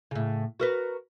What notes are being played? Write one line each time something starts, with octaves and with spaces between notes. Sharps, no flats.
A2 C#3
F#4 A#4 B4